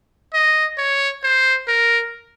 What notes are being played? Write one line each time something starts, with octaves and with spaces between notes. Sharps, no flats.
D#5
C#5
C5
A#4